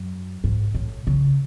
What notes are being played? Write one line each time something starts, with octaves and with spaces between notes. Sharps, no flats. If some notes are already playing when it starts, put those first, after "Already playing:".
Already playing: F#2
G#2
A2
C#3